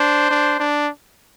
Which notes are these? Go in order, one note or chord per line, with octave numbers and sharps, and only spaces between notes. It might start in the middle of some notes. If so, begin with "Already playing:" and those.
Already playing: D4 C5
D4
D4